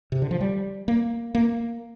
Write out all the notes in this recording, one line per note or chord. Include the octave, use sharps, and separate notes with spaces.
C3
D3
F3
G3
A#3
A#3